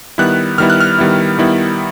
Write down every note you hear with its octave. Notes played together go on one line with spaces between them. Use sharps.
D#3 G3 B3 E4 F#6
D#3 G3 B3 E4 F6
F#6
F6
D#3 G3 B3 E4
D#3 G3 B3 E4